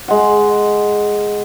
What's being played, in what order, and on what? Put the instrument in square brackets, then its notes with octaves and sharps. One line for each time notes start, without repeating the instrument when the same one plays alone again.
[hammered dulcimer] G#3 F#5